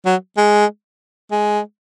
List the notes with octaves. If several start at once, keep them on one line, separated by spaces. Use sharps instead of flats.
F#3
G#3
G#3